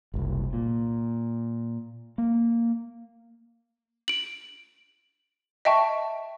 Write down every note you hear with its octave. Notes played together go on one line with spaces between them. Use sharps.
F#1 C2
A#2
A#3
D7 F#7
D#5 E5 G5 A5 C#6